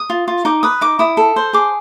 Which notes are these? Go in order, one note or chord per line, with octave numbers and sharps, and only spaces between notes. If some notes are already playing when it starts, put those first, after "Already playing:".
Already playing: D#6
F4
F4
D#4 D6
B4 D#6
D#4 D6
E4 D#6
A4
C5
G#4 D6